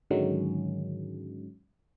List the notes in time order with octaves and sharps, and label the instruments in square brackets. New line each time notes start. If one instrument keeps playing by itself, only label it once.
[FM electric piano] G#2 D3 D#3 F#3 G#3 C#4